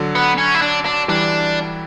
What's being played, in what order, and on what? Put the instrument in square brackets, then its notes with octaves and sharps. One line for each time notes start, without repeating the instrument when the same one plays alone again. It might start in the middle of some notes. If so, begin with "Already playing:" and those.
Already playing: [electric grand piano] D3 F#3
[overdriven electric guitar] B3
C#4
E4
D4
D4
[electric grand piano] E3 G3 [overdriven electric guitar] D4